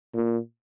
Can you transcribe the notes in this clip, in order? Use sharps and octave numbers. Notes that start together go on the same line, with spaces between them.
A#2